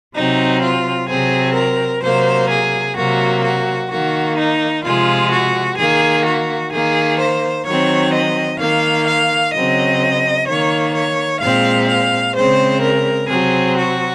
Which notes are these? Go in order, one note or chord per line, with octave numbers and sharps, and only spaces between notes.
C3 F#3 C4 D#4
F4
C3 F#3 C4 G#4
A#4
C3 F#3 A#3 C5
G#4
C3 F#3 A#3 F#4
F#4
D#3 A#3 F#4
D#4
C3 F3 G#3 F4
F#4
D#3 A#3 G#4
F#4
D#3 A#3 G#4
C5
D#3 F#3 C4 C#5
D#5
D#3 A#3 F5
F5
C#3 F#3 C4 D#5
D#3 A#3 C#5
C#5
A#2 G#3 C4 F5
F5
C#3 G#3 C4 C5
A#4
C3 F#3 C4 G#4
F#4